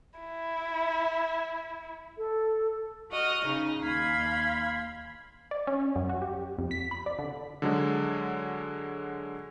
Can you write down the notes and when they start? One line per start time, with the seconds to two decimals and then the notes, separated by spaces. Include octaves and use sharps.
0.19 E4
2.18 A4
3.11 F#4 D#5 F6
3.45 C#3 D#4
3.82 D#2 F5 B5 C6 G#6
5.51 D5
5.67 C#4
5.95 F#2
6.09 F#4
6.22 G4
6.58 F2
6.71 B6
6.91 B5
7.06 D5
7.19 D3
7.62 D3 F#3 G#3